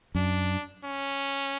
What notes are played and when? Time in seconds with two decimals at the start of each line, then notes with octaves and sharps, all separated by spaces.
0.15 F#2 D4
0.84 C#4